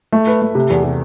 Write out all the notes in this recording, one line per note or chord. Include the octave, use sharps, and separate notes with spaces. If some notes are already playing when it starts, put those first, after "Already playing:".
A3
B4
A3
C3
E2
C3